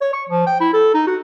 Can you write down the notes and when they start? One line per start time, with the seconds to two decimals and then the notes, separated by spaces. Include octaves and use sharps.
0.01 C#5
0.13 C#6
0.29 F3
0.47 G5
0.60 E4
0.73 A4
0.94 D#4
1.07 F#4